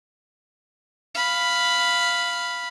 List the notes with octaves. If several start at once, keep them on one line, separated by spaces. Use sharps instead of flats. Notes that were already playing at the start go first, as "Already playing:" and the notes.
F5 B5